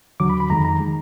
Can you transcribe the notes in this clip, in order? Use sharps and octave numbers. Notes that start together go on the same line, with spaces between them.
D#2 D3 F#3 D6
B5
B5
F2 D#3 G#3 A#5
A#5
D#3 G#3